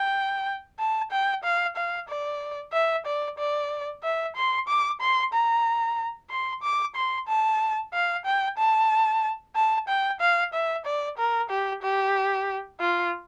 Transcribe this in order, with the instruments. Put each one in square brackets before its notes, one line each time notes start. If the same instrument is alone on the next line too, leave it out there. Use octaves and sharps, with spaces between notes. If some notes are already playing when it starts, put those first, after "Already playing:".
Already playing: [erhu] G5
A5
G5
F5
F5
D5
E5
D5
D5
E5
C6
D6
C6
A#5
C6
D6
C6
A5
F5
G5
A5
A5
G5
F5
E5
D5
A#4
G4
G4
F4